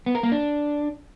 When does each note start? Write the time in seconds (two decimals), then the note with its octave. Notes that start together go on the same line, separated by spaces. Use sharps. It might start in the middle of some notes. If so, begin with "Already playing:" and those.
0.06 B3
0.15 A#4
0.23 A#3
0.32 D4